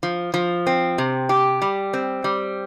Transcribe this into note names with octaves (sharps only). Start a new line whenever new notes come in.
F3
F3
C4
C3
G4
G3
C4
G3